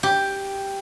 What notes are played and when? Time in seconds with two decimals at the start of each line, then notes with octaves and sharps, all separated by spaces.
0.03 G4